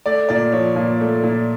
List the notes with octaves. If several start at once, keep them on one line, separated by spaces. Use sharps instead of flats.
A3 D5
A#2 D5
F3 C#5
A#2
A3
A#2